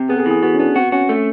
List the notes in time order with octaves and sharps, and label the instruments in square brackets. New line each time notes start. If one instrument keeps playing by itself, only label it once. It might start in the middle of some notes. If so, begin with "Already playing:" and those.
Already playing: [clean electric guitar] C3
[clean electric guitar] B3 [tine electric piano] G#4
[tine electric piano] A4
G#4
[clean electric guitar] E3
[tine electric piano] G#4
[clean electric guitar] B3 [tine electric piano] F#4
[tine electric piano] C#4
[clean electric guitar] B3 [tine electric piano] D4
[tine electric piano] C4 [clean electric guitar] F#4
[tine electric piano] C#4 [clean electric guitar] F#4
[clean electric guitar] A3